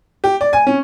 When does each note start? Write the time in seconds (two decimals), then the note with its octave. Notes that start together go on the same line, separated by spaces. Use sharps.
0.24 G4
0.41 D5
0.53 G#5
0.67 C#4